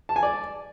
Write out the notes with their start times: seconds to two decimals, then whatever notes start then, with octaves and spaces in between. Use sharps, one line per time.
0.09 A5
0.16 G#5
0.23 D5